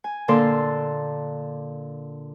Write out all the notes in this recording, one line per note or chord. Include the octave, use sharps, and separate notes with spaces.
G#5
A#2 D3 A#3 A4 D5 C6